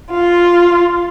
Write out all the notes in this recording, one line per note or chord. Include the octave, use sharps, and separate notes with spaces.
F4